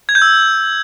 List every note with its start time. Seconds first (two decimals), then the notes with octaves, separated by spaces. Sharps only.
0.09 G#6
0.15 G6
0.22 E6